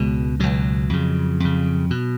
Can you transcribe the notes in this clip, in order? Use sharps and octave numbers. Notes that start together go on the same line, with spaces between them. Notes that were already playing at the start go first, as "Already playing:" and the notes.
Already playing: C#2 B2 G#3
C#2 B2 F#3
F2 C#3
F2 C#3
B2